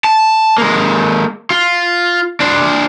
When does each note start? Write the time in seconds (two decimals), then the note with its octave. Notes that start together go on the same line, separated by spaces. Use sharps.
0.04 A5
0.58 G#3 A#3
1.51 F4
2.40 D4 C5